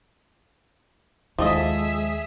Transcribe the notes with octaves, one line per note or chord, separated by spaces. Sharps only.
D#2 F3 G#3 G#4 A4 D#5 E5